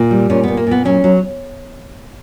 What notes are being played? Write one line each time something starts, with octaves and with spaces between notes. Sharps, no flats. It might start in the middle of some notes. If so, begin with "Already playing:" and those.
Already playing: A#2
G3
A#2 C#4
A#2 B3
A#3
A#2 B3
F#3 C#4
F#3